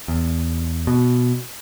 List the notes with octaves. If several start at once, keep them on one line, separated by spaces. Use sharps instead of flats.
E2
B2